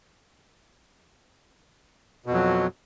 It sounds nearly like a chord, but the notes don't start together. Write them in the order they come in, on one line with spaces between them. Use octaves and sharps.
B2 F2 F#3